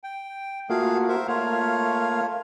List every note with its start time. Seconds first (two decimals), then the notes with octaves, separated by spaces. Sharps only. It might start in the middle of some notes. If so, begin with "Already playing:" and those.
0.04 G5
0.70 A3 A#3 F4 F#4 G#4 F5
1.08 A#4 C5 E5
1.28 A3 A#3 F4 C#5 F5